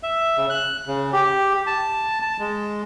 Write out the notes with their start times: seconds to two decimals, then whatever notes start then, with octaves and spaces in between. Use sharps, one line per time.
0.03 E5
0.37 C#3
0.50 F#6
0.87 C#3
1.13 G4
1.67 A5
2.22 A5
2.39 G#3